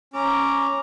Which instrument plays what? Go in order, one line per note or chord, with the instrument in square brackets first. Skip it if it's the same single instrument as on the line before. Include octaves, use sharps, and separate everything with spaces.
[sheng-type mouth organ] C#4 [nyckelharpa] A#5 D6